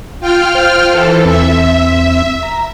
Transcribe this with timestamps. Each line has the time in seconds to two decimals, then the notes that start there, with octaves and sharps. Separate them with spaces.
0.20 F4 G5 F6
0.55 C5
0.90 E3 A4
1.25 E2 C4 E5
2.43 A#5